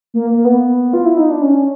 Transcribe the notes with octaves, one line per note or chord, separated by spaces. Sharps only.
A#3
A#3
B3
F4
E4
D#4
D4
C#4